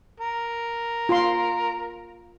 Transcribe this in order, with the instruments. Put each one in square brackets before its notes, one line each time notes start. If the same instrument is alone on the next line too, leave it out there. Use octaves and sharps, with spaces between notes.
[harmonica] A#4
[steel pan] F4 C6